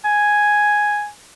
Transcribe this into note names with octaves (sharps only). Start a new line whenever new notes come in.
G#5